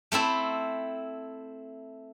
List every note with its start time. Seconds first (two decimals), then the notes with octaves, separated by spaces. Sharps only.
0.12 A3 C4 E4 A4